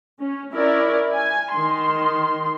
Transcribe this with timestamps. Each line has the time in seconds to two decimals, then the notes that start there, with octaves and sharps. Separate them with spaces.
0.19 C#4
0.53 C#4 E4 A#4 D5
1.11 G#5
1.52 D#3 C6